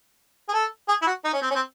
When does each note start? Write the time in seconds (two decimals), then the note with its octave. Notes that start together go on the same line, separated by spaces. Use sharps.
0.49 G#4
0.53 A4
0.89 G#4
1.02 E4
1.06 F#4
1.24 D#4
1.33 C#4
1.42 C4
1.51 C#4
1.55 C4